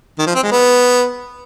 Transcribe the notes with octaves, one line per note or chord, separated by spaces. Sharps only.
D#3
F3
C4
G#3
B3